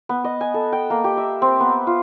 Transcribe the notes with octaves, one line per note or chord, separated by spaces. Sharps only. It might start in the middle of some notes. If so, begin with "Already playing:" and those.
B3
D#5
G#5
A4
G5
A#3
G4
E5
C4
B3
F4